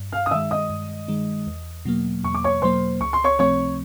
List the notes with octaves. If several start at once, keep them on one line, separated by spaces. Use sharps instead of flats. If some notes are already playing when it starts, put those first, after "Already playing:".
Already playing: G2
F5 F6
D#6
D#3 G#3 E5 E6
D#5 D#6
G2
D#3 G#3
E2
B2 F#3 A#3
E2 C#6
D6
C#5 C#6
B2 F#3 A#3 C5 C6
C#2 C#6
C6
C#5 C#6
C3 F3 A3 C4 C#5 C#6